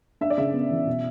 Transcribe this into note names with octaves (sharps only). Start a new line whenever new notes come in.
D4 E5
D5
C#3 E5
B3
E3
B2